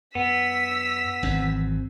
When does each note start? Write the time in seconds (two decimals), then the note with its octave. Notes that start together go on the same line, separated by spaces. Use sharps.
0.15 F#2 B3 E6 B6
1.23 G#1 F#2 E3 C4